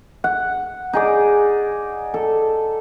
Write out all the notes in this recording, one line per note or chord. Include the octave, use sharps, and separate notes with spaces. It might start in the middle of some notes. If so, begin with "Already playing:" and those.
F#5
D#4 G#4 D5
A4